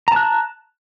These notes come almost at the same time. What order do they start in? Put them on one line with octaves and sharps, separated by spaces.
A#5 A5 F#6